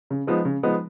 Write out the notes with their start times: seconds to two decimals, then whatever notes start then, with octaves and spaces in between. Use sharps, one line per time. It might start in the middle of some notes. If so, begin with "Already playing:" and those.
0.10 C#3
0.27 F3 G#3 B3 D#4
0.45 C#3
0.63 F3 G#3 B3 D#4